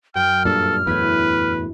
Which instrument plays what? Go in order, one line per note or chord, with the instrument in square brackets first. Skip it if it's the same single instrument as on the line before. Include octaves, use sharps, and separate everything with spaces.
[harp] F#2 [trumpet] G5 [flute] F6
[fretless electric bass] G2 A#2 [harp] D4 [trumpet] A4
[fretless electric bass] E2 A2 [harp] E4 G#6 B6 [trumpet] B4